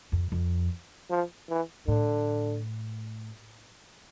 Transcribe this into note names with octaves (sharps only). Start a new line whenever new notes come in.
F2
F2
F3
E3
A2 D3